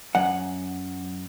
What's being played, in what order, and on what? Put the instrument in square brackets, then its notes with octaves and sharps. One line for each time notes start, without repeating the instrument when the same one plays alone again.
[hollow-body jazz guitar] F#2 F#5